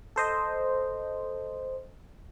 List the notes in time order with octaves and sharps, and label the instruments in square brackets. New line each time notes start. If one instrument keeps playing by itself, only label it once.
[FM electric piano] A4 C5 D#5